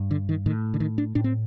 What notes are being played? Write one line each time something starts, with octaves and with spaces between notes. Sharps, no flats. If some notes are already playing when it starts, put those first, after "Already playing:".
Already playing: G2
D3
D#3
A2 D#3
D3
D#3
D4
A2 D4
C4